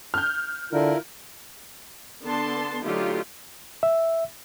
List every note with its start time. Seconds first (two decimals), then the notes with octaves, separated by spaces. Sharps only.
0.14 F6 G6
0.73 D3 E4 F4 A#4
2.22 D3 B3 A5 C6
2.83 D3 F#3 A3 D#4 F4 G4
3.83 E5